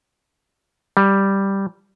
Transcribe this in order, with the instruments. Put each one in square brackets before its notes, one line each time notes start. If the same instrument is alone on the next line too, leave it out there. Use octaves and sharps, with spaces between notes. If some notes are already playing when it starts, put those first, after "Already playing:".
[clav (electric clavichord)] G3